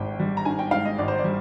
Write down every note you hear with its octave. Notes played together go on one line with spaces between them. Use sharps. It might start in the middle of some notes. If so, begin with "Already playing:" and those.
Already playing: G#1 G#2 G5
G3
A#5
D#3 G#5
G5
G#2 F5
D#5
G#1 D5
C5
D5
G3